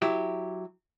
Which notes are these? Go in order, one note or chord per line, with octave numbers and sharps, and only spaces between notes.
F#3 E4 G4